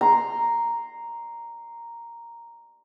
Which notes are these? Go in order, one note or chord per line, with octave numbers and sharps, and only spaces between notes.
A#5 C6